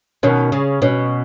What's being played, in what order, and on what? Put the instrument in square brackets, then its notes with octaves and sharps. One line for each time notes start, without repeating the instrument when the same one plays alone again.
[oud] B2 D#3 [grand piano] C#4
[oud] C#3
[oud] B2 [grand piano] C#4